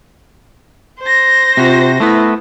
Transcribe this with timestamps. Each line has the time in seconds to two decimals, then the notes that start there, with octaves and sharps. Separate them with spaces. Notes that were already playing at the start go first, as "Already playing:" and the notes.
1.01 C5 A#6
1.57 C3 F4 F#4
2.00 A3 B3 E4 B4